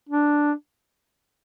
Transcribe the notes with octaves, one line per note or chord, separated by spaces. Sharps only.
D4